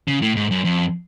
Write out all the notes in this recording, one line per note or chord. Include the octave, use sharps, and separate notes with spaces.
C#3
A2
G#2
F#2
F2